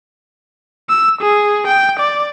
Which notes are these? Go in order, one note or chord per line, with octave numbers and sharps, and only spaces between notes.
E6
G#4
G5
D5